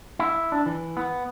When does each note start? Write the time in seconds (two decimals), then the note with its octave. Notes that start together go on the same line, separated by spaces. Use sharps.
0.19 E4
0.52 D4
0.66 E3
0.97 B3